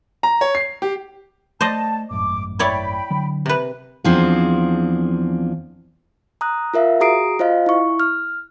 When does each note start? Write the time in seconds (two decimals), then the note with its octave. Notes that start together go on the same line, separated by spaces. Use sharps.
0.23 A#5
0.41 C#5
0.55 C7
0.82 G4
1.61 A3 C5 D5 D#5 A5
2.11 G#1 F#2 A2 D6
2.59 E4 C#5 D5 G5 B5
3.10 D3 F#3
3.46 C3 B4
4.04 E2 F3 C4 D4 G#4
6.41 A#5 D#6 F#6
6.74 F4 A#4 E5 F5
7.00 F#4 G#4 A#5 D#6 C7 D7
7.39 F4 C5 D#5 F5
7.66 E4 C#6
8.00 F6